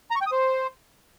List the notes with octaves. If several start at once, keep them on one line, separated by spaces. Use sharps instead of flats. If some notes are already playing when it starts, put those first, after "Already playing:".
A#5
C#6
G5
D#6
C5